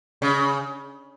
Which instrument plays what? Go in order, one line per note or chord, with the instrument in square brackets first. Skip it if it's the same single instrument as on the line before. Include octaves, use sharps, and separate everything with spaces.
[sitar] C#3